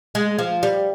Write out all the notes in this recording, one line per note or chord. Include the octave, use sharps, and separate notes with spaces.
G#3
F3
G3